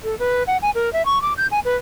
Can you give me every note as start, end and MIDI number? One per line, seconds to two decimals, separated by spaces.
0.04 0.17 69
0.19 0.43 71
0.47 0.57 78
0.62 0.70 80
0.75 0.92 70
0.93 1.05 76
1.05 1.21 85
1.22 1.33 86
1.37 1.47 91
1.51 1.60 80
1.65 1.75 71